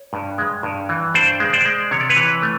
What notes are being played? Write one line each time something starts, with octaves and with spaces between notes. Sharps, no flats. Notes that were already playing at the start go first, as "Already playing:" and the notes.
Already playing: C#5
G2
G#3
G2
E3
G2 C5 D5
G#3
C5 D5
G#3
C3 C#5
D5
B4 C#5
E3
A3